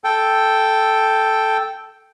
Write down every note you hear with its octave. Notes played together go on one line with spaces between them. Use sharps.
A4 G5